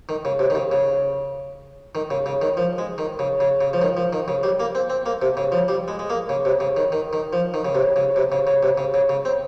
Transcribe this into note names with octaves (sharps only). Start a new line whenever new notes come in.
D#3
C#3
C3
D#3
C#3
C#3
D#3
C#3
C#3
D#3
F3
G#3
D#3
C#3
C#3
C#3
F3
D#3
F3
D#3
C#3
G3
A#3
C4
C4
A#3
C3
C#3
F3
G3
G#3
G#3
A#3
C#3
C3
C#3
D#3
D#3
D#3
F3
D#3
C#3
C3
C#3
C3
C#3
C#3
C3
C#3
C#3
C#3
C4